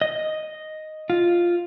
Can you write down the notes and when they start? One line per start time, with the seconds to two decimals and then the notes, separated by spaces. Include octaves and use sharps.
0.01 D#5
1.10 F4